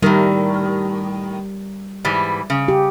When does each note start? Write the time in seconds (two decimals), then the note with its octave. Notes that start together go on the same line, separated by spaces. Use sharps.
0.02 A2 D#3 G3 A#4
2.05 G#2 E3 G3
2.50 C#3
2.68 G4